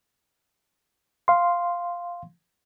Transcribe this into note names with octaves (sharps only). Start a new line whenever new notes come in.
F5 C6